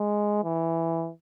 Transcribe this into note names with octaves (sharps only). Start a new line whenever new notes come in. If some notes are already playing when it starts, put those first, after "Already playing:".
Already playing: G#3
E3